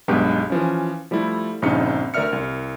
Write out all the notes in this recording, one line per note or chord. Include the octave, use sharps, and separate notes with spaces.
B1 G2 G#3 B3 G4 G5
E3 F3 C#4
F3 G3 A3 E4
A#1 G2 C#3 C4 D#4 C#7
D2 A#4 D5 E5 F6 C#7
C2